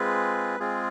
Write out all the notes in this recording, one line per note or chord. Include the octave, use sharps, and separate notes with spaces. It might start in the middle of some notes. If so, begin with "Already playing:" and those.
Already playing: G#3 C4 F4 G#4 B4
G#3 C4 F4 G#4